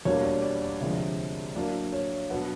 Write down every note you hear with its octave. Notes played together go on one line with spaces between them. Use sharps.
E2 B2 G3 A#3 D4 C#5
D5
D5
D5
D2 C3 F3 G#3 D5
A2 F#3 A#3 D4 D5
C#5
B2 F#3 B3 D4 F#5